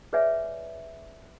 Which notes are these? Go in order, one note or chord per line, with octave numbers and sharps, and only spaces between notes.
G#4 B4 C#5 D5 E5 G#5